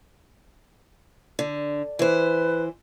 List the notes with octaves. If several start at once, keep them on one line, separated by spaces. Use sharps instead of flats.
D3
E3 B4 C5